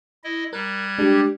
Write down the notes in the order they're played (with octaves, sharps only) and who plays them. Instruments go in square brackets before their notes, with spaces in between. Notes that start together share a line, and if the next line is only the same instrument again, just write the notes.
[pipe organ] E4 D#5
[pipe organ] G3 F#6 G#6 [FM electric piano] A#4
[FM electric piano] G#3 D4 [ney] G4